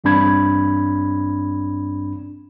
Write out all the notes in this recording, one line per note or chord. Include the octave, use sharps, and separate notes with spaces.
A1 G2 C4 D4 B5 G#6